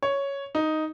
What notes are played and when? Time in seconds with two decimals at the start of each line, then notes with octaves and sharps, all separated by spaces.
0.03 C#5
0.55 D#4